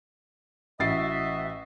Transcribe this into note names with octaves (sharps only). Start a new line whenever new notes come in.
A1 F#4 D#5 E5 A6 C7